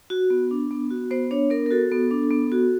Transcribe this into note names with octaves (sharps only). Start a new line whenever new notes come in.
F#4
B3
D4
B3
F#4
B3 C5
D4 C#5
B3 A#4
A#4
F#4 A4
B3
D4
B3
F#4